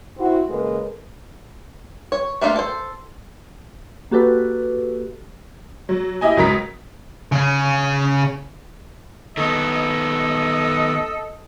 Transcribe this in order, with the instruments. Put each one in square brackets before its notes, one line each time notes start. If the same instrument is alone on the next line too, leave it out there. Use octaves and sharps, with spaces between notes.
[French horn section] C4 E4 F#4
C#3 G#3 A#3 A4 B4
[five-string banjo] C#5
A3 A#3 D4 D#4 F4
A4 C5
[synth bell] A#3 F#4 G4 A4 B4
[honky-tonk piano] F#3
E4 G4 D#5 G#5
C#2 F#3 A#4 A#5 D#6 B6
[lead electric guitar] C#3 C#4
[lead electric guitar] D#3 B3 [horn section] A4 D#5